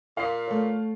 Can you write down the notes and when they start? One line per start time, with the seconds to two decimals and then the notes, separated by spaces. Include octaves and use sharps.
0.17 A#2 F5 C7
0.48 A3 C#5